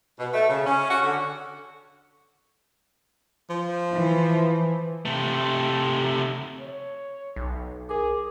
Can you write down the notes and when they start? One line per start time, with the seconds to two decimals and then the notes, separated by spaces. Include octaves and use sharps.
0.18 B2
0.32 A3
0.48 C#3
0.64 C#4
0.89 F#4
1.03 D3
3.50 F3
3.94 E3
5.05 C3 A3
6.60 C#5
7.36 B1
7.89 G#4 A#4 D6